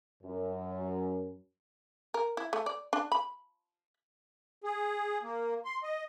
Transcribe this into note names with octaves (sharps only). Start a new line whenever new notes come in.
F#2
A#4
E4
A3
D5
D4
B5
G#4
A#3
C6
D#5